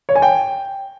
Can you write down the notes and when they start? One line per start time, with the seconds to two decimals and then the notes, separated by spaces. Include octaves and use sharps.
0.09 C#5
0.15 G#5
0.22 G5